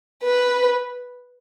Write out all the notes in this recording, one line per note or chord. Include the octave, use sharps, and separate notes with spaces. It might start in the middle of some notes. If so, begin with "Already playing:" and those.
B4